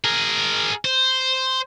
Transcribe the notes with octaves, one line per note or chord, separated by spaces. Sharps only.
G#4 A#4
C5